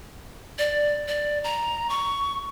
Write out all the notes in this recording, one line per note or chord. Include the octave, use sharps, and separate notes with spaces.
D5
D5
A#5
C#6